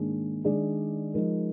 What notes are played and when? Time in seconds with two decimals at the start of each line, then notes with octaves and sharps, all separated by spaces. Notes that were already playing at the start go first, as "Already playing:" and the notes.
Already playing: G#2 D#3 A#3 D4 G#4
0.45 D#3 G#3 D4 G#4 D5
1.14 F3 G#3 D#4 A#4